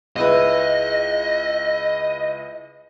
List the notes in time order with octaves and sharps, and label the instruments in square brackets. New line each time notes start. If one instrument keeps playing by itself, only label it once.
[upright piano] C#2 E4 B4 [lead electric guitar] D#5